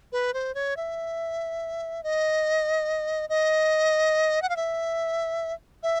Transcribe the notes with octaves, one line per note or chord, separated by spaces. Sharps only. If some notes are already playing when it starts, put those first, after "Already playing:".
B4
C5
C#5
E5
D#5
D#5
F#5
F5
E5
E5